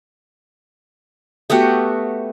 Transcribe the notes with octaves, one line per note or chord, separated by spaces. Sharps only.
A3 B3 F#4 G4